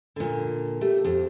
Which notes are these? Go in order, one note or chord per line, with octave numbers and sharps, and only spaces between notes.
A#2 D3
A3 G4
F2